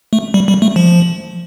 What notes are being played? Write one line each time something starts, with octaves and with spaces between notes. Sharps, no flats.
A3
G3
G3
A3
F3